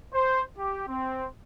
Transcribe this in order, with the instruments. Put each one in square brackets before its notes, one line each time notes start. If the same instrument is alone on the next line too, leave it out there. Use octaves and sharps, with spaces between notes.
[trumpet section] C5
G4
C4